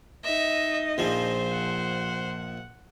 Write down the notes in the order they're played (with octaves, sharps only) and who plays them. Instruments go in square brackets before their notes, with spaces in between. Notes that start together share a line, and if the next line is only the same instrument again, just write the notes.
[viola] D#4 D#5 [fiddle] E5
[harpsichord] A#1 F3 [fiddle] C5
[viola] F#5